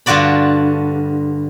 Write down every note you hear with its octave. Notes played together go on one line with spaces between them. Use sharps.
G2 D3 F4 F#4 D5 B5